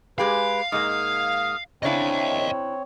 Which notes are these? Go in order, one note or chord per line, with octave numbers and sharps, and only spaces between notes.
G#3 G4 G#4 B4 F5
G#2 G#3 A#3 D#6 F6
C#3 C4 D4 E4 C#5 D#5 F5